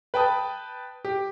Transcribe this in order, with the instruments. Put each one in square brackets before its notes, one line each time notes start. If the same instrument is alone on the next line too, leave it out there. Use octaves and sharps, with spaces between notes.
[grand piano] B4 G5 A5 D#6
G4